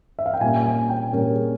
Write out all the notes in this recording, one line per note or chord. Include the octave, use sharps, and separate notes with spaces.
E5
F5
G5
A#2 G3 A#3 C#4 G#5
G#5
G5
A#2 G3 A#3 C#4 A#4
G#4